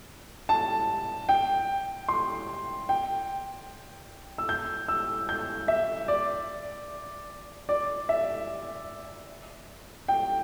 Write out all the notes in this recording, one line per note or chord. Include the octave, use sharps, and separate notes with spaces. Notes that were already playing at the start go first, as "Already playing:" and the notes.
A5
G5
C6
G5
E6
G6
E6
G6
E5
D5
D5
E5
G5